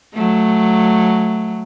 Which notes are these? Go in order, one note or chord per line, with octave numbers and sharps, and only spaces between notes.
F#3 A3